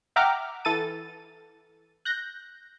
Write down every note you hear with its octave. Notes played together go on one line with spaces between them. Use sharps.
E5 F#5 G5 A#5 D6 F6
E3 A4 A6 D#7
F#6 G6 A#6